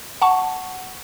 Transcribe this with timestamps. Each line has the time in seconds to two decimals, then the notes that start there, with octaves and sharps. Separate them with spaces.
0.22 F#5 A5 C#6